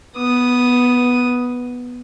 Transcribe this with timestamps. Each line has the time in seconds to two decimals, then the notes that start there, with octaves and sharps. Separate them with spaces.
0.17 B3 D#6